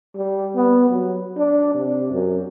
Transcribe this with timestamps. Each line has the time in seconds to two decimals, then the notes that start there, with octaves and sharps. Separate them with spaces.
0.16 G3
0.55 B3
0.90 F#3
1.37 D4
1.75 C3
2.12 F#2